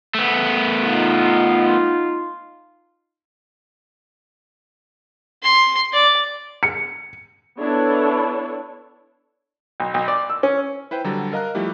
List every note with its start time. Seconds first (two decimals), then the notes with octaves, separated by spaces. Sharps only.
0.15 A3 B3
0.84 D#4 F4
5.43 C6
5.93 D5
6.63 C#7
7.58 B3 D4 E4 A4 C#5
9.80 B1
9.94 B1
10.08 D5
10.30 E6
10.43 C#4
10.91 E4 B4 C5 G5
11.04 D3 F#3 G3 A4 A#5
11.33 A#4 D#5 F5 A#5 F6 F#6
11.55 F3 G3 A3 E4 G4